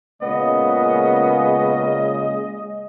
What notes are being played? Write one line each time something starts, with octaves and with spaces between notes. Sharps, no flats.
A#2 C#3 G#3 B3 D#5